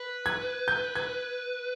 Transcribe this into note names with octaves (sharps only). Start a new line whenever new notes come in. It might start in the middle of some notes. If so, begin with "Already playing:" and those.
Already playing: B4
G#6
G6
G#6